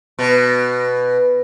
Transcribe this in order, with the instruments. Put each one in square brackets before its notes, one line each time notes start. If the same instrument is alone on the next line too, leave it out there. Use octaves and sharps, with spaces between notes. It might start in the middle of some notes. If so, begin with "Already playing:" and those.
[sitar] B2